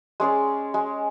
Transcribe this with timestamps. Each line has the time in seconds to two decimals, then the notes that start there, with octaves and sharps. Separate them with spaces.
0.20 G#3 C#4 G#4 D5
0.74 G#3